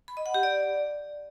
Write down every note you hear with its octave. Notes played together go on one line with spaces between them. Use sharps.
B5
D#5
F#5
G4
D5